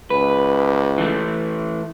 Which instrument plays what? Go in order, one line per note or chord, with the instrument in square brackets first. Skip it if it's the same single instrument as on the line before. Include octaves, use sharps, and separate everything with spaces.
[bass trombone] C#2 [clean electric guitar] B4
[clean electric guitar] E3 A3